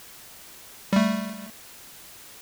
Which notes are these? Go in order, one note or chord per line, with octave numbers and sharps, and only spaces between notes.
G3 A3